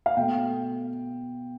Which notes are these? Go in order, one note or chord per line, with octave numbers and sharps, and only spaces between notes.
F5
B2 A3 G5